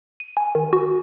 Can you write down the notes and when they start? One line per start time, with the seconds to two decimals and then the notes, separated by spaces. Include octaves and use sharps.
0.20 D#7
0.37 G#5
0.55 D#3
0.73 F#4